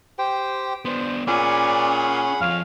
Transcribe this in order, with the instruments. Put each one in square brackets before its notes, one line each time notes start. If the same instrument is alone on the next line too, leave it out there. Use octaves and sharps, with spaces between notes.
[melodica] G4 C5 G5
[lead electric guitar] B3 D4 [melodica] C5
[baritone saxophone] A#2 [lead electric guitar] C#4 [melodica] G#4 F#5 B5 [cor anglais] D5
[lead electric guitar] F2 F3 [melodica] C#5 [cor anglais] F5